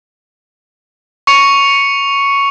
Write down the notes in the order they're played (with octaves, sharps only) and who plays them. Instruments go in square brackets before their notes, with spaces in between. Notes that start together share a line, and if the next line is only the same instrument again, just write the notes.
[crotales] C#6 C#7 F7